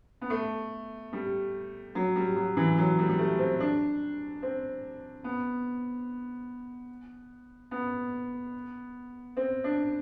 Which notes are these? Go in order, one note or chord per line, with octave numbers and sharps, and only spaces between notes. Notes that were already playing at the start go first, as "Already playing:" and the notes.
B3
A3
G3
F#3
G3
F#3
E3
F#3
G3
G3
A3
C4
D4
C4
B3
B3
C4
D4